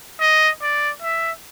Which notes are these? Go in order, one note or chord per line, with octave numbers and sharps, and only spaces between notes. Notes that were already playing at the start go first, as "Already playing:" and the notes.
D#5
D5
E5